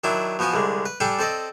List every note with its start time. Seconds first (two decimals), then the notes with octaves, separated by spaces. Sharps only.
0.04 D#3 F#3 D4 E4
0.39 B2 F3 B3 F#4 G#5
0.54 C2 D3 G#3
0.86 B4
1.00 G3 D4 A4 G5 G#5
1.19 C4 A4 D5 D#5